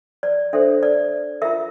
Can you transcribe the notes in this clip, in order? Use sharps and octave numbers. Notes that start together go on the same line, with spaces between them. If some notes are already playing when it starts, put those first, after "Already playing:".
D5
D4 A4 C5 E5
D5
F4 A#4 E5